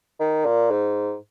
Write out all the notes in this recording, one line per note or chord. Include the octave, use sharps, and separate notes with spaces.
D#3
A#2
G#2